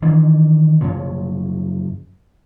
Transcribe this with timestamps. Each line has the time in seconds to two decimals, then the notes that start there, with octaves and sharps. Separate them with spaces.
0.02 D#3 E3 D4
0.81 F#2 C#3 F3 F#3